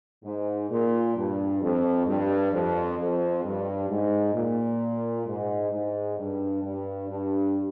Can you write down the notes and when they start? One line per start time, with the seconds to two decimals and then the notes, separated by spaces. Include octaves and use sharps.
0.24 G#2
0.70 A#2
1.16 G2
1.62 F2
2.07 G2
2.52 F2
2.98 F2
3.44 G2
3.89 G#2
4.34 A#2
5.26 G#2
5.72 G#2
6.18 G2
6.63 G2
7.09 G2